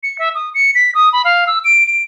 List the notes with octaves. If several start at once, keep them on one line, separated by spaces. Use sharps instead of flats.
C#7
E5
D#6
C#7
B6
D#6
B5
F5
E6
D7
D7